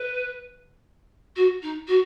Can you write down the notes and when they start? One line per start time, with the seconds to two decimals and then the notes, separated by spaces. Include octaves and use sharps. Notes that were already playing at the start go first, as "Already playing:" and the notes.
Already playing: B4
1.36 F#4
1.62 D#4
1.88 F#4